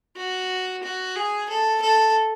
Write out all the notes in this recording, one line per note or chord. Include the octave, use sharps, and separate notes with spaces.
F#4
F#4
G#4
A4
A4